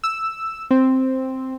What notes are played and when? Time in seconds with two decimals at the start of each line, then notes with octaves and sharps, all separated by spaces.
0.04 E6
0.71 C4